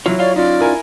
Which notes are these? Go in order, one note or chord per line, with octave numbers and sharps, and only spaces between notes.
F#3 E4 F4 C#5
F4 C#5 D5 F5
C#4 D#4 F4 D5
E4 A#4 G#5